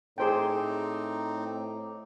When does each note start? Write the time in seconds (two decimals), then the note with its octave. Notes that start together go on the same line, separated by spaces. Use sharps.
0.18 A2 C4 D#4 G#4 C5 G5 A#5 D6